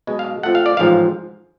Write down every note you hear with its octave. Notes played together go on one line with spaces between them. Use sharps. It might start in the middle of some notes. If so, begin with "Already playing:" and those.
B1 B2 G#3
F5
F2 F3 A3 F#5
F5
D5
A1 G#2 F3 F5